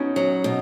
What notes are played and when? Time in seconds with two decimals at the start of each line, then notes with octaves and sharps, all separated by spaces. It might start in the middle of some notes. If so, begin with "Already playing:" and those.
Already playing: B2 C#4 D#4
0.16 F#3
0.44 B2